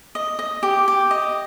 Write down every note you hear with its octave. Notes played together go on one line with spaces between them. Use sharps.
D#5
D#5
G4
G4
D#5